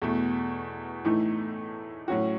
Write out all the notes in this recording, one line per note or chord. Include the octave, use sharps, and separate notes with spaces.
E2 B2 A3
A2 E3 A3 D#4
A2 F#3 C#4 F#4